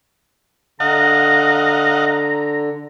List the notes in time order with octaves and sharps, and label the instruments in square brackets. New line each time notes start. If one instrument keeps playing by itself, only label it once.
[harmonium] D3 [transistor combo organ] D#5 F5 F#5 [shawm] A#5